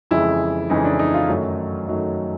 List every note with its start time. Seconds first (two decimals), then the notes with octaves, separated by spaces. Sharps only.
0.11 F2 C#3 E3 G#3 E4
0.70 F2 C#3 E3 G#3 D#4
0.85 D4
0.99 D#4
1.14 F4
1.29 F#2 D#3 F#3 A3
1.87 F#2 D#3 F#3 A3